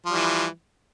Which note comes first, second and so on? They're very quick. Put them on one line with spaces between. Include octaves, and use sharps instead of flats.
F3 G3 E3